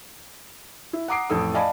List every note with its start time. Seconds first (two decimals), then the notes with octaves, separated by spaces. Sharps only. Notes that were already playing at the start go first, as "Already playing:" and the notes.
0.93 E4
1.08 F#5 A#5 D6 D#6 C7 D7
1.30 A1 F2 A4 D#6
1.54 D5 D#5 F5 G#5 A5 B5